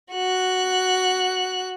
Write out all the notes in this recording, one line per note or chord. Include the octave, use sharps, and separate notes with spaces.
F#4 F#6